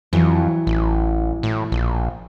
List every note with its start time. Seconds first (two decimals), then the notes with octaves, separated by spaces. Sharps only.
0.13 F2 E3 F#3
0.67 A1
1.43 A2
1.72 A#1